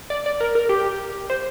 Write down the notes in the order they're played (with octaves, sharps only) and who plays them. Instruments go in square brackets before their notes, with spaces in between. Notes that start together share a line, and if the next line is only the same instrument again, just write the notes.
[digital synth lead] D5
D5
A#4
A#4
G4
C5